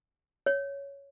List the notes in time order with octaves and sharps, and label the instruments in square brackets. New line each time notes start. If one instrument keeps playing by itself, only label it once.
[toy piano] C#5